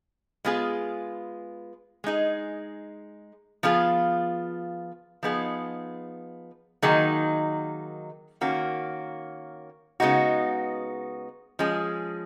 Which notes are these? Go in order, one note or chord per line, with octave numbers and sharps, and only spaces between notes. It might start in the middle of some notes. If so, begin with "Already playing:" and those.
G#3 B3 F4 G#4
G#3 D#4 G#4
F3 B3 F4 G#4
F3 B3 D#4 G#4
D#3 F#3 A#3 D#4 G#4
D#3 A#3 C#4 F#4
C#3 G#3 B3 D#4 F#4
F3 G#3 C#4 G#4